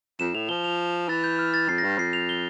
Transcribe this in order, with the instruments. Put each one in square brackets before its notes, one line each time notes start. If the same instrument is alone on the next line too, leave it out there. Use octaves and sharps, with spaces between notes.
[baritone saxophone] F2 [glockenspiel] E7
[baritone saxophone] A2 [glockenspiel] F7
[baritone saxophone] F3 [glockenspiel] G7
[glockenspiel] F7
[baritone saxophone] E3 [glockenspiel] A6
[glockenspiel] G6
F6
A6
[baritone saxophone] F2 [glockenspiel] C7
[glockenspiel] A#6
[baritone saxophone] G2
[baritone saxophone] F2 [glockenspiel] C7
[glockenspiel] F7
G7